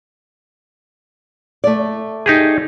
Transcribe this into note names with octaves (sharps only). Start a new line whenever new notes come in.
A3 D5
D#4 G4 G#4